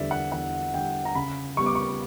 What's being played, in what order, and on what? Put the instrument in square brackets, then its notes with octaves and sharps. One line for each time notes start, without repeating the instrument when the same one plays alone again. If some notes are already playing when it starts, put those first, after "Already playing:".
Already playing: [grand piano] E2 D3 G3 D5 E5
F#5
E2 F#5
D3 G3 G5
A#5
C#3 B5
G3 B3 C#6
D6
C#6